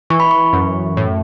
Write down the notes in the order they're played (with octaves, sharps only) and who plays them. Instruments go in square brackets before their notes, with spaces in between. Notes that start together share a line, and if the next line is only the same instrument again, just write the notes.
[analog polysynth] E3 [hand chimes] C#6
[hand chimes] B5
C#6
[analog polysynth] F#2
A2